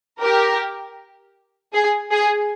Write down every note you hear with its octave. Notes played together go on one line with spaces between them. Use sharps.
G4 A#4
G#4
G#4